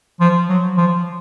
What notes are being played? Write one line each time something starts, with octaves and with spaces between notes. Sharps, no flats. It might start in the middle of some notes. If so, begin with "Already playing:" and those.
F3
F#3
F3